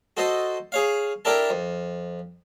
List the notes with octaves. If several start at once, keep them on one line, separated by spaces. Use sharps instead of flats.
F#4 A4 C5 D#5
G#4 C#5 F5
D4 E4 G4 A4 A#4 A5
F2